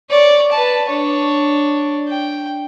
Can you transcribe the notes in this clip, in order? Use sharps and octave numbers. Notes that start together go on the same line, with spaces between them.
C#5 D5
B4 A5
D4 C#5
G5